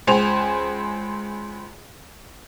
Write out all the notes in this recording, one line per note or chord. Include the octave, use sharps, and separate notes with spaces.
C#2 C5 G#5 F7